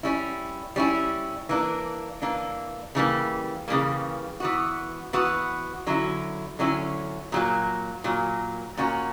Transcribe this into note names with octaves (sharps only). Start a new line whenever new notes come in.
G3 C#4 E4
G3 C#4 E4
E3 A#3 D4
E3 A#3 D4
C#3 E3 G3 A#3
C#3 E3 G3 A#3
E3 B3 F#4
E3 B3 F#4
D3 F#3 C#4 E4
D3 F#3 C#4 E4
A#2 F#3 A#3
A#2 F#3 A#3
A#2 A#3 C#4 F#4